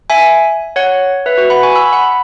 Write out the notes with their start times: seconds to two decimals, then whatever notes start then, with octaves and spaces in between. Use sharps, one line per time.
0.10 E5 G#5
0.76 C#5 F#5
1.26 B4 E5
1.38 F#4 B4
1.50 F#5 B5
1.63 G#5 C#6
1.75 B5 E6
1.93 F#5 B5
2.04 B5